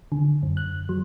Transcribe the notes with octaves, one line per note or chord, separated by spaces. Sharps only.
D3
F#2
F#6
F#3